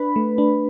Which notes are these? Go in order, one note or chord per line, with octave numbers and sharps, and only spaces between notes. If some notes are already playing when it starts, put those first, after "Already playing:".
Already playing: D4 B4 B5
A3
D4